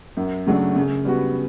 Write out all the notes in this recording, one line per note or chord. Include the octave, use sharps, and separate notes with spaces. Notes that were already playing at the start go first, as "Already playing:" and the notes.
F#2
C#3 F#3 A3 D4
C#3
G3 B3 F#4